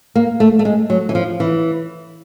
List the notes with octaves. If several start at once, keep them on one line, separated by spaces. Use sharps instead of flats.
A#3
A3
A3
G#3
F#3
E3
F3
E3